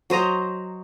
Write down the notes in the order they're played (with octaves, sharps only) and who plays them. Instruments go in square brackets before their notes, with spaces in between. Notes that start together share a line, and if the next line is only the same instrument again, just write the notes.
[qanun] F#3 C5 D#5 A#5